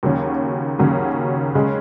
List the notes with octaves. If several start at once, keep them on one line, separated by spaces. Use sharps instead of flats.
D#2 C#3 F#3 C#4
D#2 C#3 F#3 C#4
C#3 G#3 C#4 G#4